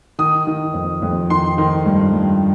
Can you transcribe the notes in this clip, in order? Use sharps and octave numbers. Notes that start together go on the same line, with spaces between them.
D#3 D#6
D#3
F2
F2
D#3 C6
D#3
G2
G2